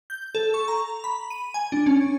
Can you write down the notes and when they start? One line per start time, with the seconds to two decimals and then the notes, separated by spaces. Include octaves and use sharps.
0.10 G6
0.35 A4
0.54 C#6
0.68 A#5
1.04 B5
1.30 D#7
1.54 G#5
1.72 D4
1.86 C#4